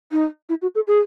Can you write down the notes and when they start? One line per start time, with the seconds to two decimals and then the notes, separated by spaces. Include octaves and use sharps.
0.12 D#4
0.49 E4
0.62 F#4
0.75 A4
0.87 G#4